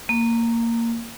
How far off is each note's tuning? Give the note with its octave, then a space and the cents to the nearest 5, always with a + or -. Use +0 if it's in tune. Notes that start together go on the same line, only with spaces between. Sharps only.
A#3 -15